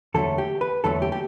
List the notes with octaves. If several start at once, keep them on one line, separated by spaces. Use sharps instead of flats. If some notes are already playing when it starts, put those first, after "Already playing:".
E2 D3 F#3 A3 A4
G4
B4
E2 D3 F#3 A3 A4
G4
G4